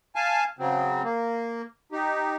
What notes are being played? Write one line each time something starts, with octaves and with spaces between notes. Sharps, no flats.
F5 G#5 A5
C#3 F#3 C4
A#3
D#4 G4